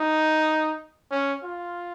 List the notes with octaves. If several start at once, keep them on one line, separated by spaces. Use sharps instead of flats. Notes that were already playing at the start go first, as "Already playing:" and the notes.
Already playing: D#4
C#4
F4